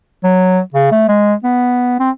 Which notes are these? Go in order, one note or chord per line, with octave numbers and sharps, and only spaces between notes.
F#3
C#3
A3
G#3
B3
C4